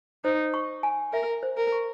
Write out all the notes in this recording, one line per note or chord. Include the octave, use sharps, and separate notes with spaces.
D#4 C5
C#6
G#5
A#4 E5
C5
A#4
C#6